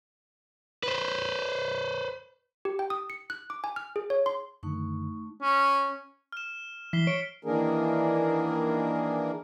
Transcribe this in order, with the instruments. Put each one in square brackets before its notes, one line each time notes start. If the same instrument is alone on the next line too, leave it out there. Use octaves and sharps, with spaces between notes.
[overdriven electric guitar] B4 C5
[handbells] G4
G5
D#6
C#7
F#6
D6
G#5
F6
G#4
C#5
C6
[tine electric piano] F#2 D3 D#3 [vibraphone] A3 D#4 C#6
[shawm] C#4
[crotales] F6 E7
[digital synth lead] E3 [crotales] B6 C7 G7
[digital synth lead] C#5 [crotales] D7
[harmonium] D#3 E3 A#3 D4 G#4 A#4